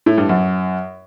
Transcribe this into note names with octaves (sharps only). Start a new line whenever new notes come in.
A2
G2
F#2